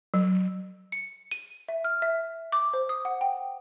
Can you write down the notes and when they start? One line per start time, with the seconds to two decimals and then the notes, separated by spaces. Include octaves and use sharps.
0.14 F#3
0.92 C#7
1.31 D#7
1.68 E5
1.84 F6
2.02 E5
2.52 D6
2.73 C5
2.89 D#6
3.05 F#5
3.21 G5